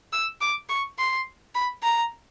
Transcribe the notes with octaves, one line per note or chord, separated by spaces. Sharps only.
E6
D6
C#6
C6
B5
A#5